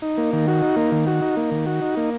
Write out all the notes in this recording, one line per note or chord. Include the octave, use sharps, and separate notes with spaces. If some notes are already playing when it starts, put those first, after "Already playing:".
D#4
A#3
D#3
F#4
D#4
A#3
D#3
F#4
D#4
A#3
D#3
F#4
D#4
A#3